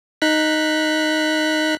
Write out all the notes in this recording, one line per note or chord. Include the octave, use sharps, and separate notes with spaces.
D#4 F#6 B6